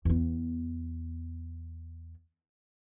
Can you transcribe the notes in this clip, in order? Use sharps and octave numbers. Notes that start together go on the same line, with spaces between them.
E2 B3